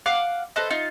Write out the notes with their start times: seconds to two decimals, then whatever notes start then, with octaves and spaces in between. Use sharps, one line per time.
0.06 F5 F#5 D6
0.56 A4 B4 C5 D#5
0.70 D#4 F4